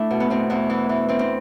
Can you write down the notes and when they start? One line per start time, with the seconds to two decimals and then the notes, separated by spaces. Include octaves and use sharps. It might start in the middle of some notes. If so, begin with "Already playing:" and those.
Already playing: A3 D4 E4
0.11 B2
0.20 B3
0.30 B2 C4
0.50 E2 B3
0.70 E3
0.89 E3
1.08 E3 C4
1.19 C4